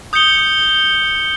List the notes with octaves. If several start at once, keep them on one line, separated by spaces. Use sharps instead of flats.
D#6 G6 C#7 G7